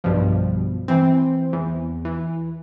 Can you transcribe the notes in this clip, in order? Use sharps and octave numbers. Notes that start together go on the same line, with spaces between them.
B1 G2 B2 F3
E3 C4
E2
E3